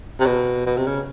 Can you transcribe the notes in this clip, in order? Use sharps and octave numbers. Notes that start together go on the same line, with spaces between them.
C3
B2
B2
C3
C#3